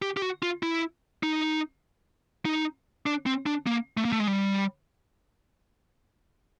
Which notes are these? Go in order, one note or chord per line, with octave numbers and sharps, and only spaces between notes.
G4
G4
F#4
F4
E4
D#4
D#4
D4
C4
D4
A#3
A3
A#3
A3
G#3
G3